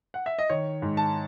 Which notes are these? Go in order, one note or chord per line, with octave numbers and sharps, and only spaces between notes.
F#5
E5
D#5
D#3 C#5
G#2
A5